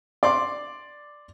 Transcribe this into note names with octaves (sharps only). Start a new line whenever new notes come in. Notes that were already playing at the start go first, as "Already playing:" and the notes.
D5 C6 D6